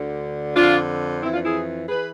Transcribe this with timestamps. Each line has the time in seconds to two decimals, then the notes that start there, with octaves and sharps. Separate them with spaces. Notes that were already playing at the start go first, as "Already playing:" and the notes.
Already playing: D2 D3
0.56 F2 D3 D4 F4
1.23 F2 E3 C4 E4
1.33 D4 F4
1.45 E4 G#4
1.89 E3 G#4 B4